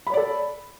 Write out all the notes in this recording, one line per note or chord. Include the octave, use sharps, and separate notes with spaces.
A4 C#5 D5 B5